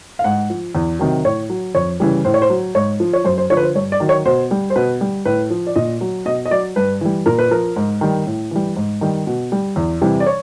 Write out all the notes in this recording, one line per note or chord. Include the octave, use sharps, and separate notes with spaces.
F5
G#2 F#5
F3
E2
C3 D#3 F#3
A2 C#5
F#3
F2 C#5
C#3 E3 G3
A2 C5
C#5
C5
F#3
G#2 C#5
F3
C#5
F#2 C5
C5
D3 F3 C#5
B4
C5
G2 C#5
D5
D#3 F#3
C#5
B2 C5
G3
C5
B2 B4
G3
A2 B4
F3
D5
A#2 D#5
F#3
B2 D#5
D#5
F#3 D5
G2 B4
E3 G3
A#2 A#4
B4
F3 A#4
G#2
D#3 G3
A2
E3 G3
G#2
D#3 G3
B2
G3
E2
C3 E3 G3
D5
C#5